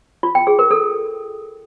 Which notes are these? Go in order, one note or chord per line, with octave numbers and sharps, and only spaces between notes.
F4
G5
G#4
A#4
A4